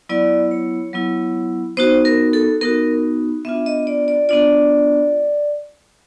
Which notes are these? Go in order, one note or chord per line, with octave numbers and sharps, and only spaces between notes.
F#3 B3 E4 D5
C#5
F#3 B3 E4
B3 D#4 F#4 C5
A#4
A4
B3 D#4 F#4 A#4
B3 D4 F4 E5
D#5
D5
D5
B3 D4 F4 D5